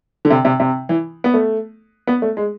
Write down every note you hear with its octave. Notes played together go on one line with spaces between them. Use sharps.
D3
C3
C3
C3
E3
B3
A3
B3
A3
G#3